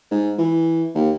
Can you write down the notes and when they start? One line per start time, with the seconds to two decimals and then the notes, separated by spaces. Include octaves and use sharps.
0.11 G#2
0.39 E3
0.95 D#2